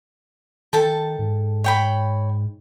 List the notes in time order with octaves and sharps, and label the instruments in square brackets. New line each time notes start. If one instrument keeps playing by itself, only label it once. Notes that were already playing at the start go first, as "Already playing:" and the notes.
[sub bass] D#3 [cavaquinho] A4 G5 A5
[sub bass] G#2
[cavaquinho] C#5 G5 B5